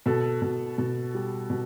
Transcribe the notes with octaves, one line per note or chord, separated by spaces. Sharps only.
B2 A4
B2
B2
G3
B2